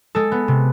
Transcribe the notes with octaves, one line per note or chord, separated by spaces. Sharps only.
G#3 A4
B3
C3